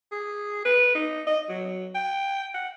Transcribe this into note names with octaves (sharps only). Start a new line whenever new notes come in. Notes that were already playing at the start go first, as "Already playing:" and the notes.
G#4
B4
D#4
D#5
F#3
G5
F#5